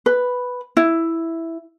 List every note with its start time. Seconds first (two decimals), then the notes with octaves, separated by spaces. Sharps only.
0.06 B4
0.77 E4